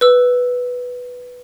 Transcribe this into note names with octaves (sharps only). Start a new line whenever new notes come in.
B4 E6